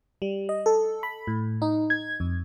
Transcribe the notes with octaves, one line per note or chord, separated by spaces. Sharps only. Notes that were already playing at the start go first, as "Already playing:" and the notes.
G3
D#5
A4
B5
A2
D#4
G#6
F2